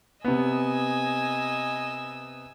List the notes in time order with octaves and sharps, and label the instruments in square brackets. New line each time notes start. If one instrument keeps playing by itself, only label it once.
[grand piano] C3 B3 [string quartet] D#5 G#5 E6